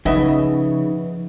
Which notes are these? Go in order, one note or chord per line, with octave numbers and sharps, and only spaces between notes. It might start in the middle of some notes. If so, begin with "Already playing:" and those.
C#3 F3 B3 D#4 B4 D#5 E5